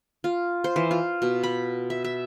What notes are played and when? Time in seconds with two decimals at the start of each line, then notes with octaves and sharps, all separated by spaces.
0.24 F4
0.64 C5
0.76 E3
0.91 F4
1.22 B2
1.43 B5
1.90 E5
2.04 E5